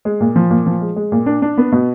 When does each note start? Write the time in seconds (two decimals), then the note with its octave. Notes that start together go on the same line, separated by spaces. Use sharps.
0.05 G#3
0.21 A#2
0.36 F3
0.50 A#2
0.66 F3
0.81 G#3
0.96 G#3
1.12 A#2
1.26 D4
1.42 D4
1.58 B3
1.72 B2